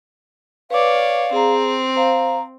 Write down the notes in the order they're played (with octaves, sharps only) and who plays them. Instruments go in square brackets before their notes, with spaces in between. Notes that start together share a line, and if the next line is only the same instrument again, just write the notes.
[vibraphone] B4 D6 [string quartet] C#5 D5 [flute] F5
[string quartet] C4 [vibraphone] G#4 A#5
[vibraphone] C5 F5 [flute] A#5